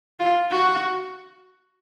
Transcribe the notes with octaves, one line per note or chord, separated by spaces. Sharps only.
F4
F#4